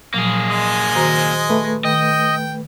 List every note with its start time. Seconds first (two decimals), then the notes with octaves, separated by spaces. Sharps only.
0.14 A#2 F3 F#3 A#3 G#4
0.50 G#3 D#5 D#6
0.95 D#3 F#4 C5 A#5
1.49 A3 B4
1.85 D#3 D#5 G5